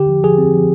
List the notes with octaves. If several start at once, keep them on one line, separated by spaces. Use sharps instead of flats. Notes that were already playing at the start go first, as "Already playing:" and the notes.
Already playing: D3 G4
F3
F3 G#4
C4
F3